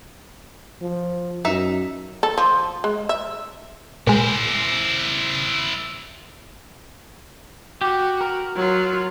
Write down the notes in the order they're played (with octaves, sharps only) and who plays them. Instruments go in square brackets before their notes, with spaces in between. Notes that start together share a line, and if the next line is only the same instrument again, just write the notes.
[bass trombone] F3
[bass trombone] F#2 [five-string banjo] D#4 E5
[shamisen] A4
F3
G#3
E5
[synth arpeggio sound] A#2 G#3 [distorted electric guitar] E4 C5
[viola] F#4 [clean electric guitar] G4
[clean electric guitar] A#4
[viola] F#3 F4